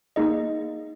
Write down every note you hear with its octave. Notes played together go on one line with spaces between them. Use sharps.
A#3 D#4 G#4 D#5